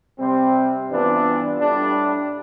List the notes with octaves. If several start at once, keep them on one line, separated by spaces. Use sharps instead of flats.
C3 G3 C4
G2 E3 B3 D4 F4
A2 G3 D4